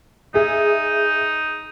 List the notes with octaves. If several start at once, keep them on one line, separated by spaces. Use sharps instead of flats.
D#4 G#4 E5